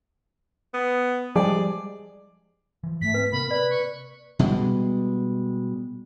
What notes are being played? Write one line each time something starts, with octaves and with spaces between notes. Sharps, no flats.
B3
F3 G3 G#3 G#4 D5
E3 F3
G#2 A3 B6
C4 B4
C3 A#3 C4 A#4 B5
B4 D5 B5
C#6
B2 G3 G#3